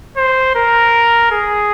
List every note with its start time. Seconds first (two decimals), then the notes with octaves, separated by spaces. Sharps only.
0.17 C5
0.55 A#4
1.31 G#4